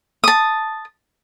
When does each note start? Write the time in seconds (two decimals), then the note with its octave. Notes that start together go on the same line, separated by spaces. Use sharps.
0.24 A5 D#6